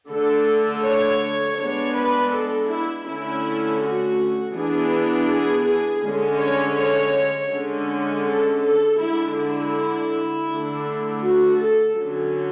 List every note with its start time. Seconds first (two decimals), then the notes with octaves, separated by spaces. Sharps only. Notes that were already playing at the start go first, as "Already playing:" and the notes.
0.09 D3 A3 D4 A4
0.83 C#5
1.57 G#3 B3 D4 C#5
1.94 B4
2.31 A4
2.68 E4
3.05 D3 A3 C#4 E4
3.79 F#4
4.54 E3 B3 D4 G#4
5.28 G#4
5.65 G#4
6.02 D3 G#3 C#4
6.39 C#5
6.76 C#5
7.51 D3 G#3 C#4
8.25 A4
8.61 A4
8.99 D3 G#3 D4 E4
9.37 E4
10.48 D3 A3 D4
11.22 F#4
11.59 A4
11.95 D3 F#3 C#4